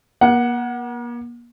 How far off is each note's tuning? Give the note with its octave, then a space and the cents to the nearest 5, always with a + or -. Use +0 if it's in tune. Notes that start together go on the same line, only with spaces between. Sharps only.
A#3 +40 F#5 +0